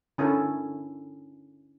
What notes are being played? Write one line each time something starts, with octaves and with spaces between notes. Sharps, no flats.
D3 C#4 E4 A4 A#4